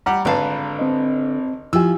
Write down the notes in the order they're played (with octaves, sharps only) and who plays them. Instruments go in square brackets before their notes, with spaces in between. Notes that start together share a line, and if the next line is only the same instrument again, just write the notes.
[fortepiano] G3 G4 F#5 [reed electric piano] A#5
[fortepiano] G#1 B4 A5 [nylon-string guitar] D3 F5
[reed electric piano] C4 D#5
[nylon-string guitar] F3 [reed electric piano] E4 F4 G4 [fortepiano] G#5 E6